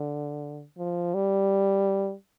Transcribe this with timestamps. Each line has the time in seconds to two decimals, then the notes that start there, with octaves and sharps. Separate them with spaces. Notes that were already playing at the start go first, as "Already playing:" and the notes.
Already playing: D3
0.79 F3
1.15 G3